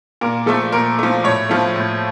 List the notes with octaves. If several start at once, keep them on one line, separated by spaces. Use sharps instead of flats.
A#2 A#4
F3 A3 A4
A#2 A#4
F3 A3
A2 C#5
F3 A3
A2